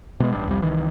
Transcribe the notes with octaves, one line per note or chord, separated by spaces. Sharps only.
B2 G#3 B3
A1 G2
C2 F2 G3
C2 D#3 E3